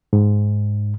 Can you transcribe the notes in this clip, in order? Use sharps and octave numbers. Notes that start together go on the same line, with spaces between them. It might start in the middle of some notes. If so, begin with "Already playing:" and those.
G#2